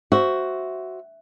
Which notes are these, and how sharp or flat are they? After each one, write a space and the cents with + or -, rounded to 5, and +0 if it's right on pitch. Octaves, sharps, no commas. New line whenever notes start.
F#4 +10 C5 +0 E5 +0